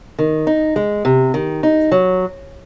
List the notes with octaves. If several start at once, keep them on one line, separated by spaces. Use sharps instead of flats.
D#3
D#4
G#3
C3
D#3
D#4
F#3